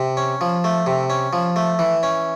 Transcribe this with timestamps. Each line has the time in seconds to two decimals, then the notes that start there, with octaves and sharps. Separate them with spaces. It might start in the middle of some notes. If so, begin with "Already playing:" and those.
Already playing: C3
0.17 C#4
0.41 F3
0.64 A3
0.86 C3
1.10 C#4
1.33 F3
1.56 A3
1.79 E3
2.03 C#4